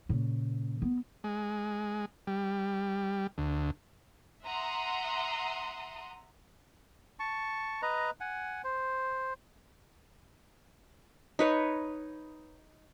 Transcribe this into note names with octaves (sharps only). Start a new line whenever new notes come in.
A#2 C#3
B3
G#3
G3
D2
E5 F#5 A#5 C6 D#6
A5 C#6
B4 D#5 A#5
F#5 G#5
C5
D#4 B4 C#5